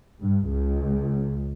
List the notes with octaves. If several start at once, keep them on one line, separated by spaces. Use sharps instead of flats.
G2
C#2